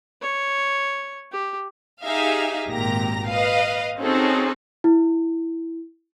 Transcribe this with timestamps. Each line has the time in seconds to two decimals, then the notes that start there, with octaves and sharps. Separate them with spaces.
0.21 C#5
1.32 G4
2.02 D#4 G4 G#4 E5 F5
2.70 G#1 A#2 G4 A#5 A#6
3.28 B4 D#5 F5
3.98 C4 C#4 D#4 F#4 G#4 A4
4.84 E4